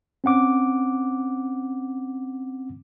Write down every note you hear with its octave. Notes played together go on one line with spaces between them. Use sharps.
C4 C#4 F#5 D6